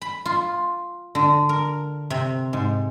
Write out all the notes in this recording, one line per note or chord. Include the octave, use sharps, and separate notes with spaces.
B5
F4
D3
A#4
C3
G#2